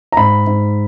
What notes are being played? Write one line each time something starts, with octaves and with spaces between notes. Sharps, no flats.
A#5
G#2 B5
G#2